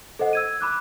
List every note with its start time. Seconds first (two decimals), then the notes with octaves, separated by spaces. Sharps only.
0.19 A4 C5 D#5 F#5
0.33 E6 G#6 D#7
0.61 B5 D6 F#6